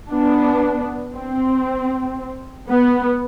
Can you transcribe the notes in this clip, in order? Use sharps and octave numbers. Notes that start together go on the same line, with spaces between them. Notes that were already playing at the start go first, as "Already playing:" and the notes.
B3 D4
C4
B3